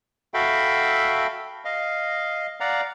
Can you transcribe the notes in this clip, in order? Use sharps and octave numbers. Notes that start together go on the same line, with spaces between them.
F#4 A4 E5 F5 G5 B5
D#5 F5
D5 F5 F#5 A#5